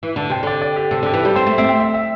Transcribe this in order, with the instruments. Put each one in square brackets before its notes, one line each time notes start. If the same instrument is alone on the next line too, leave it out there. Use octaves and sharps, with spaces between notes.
[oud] E3
[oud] D3 [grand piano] A5
[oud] C3 [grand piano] G5
[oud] D3 [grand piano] D5
[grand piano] D5
G4
[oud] C3 [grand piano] A4
[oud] D3 [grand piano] G4
[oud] E3
[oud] G3 [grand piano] A4
[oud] C4 [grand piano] C5
[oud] A3
[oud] C4 [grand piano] E5
[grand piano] G5
E5
E5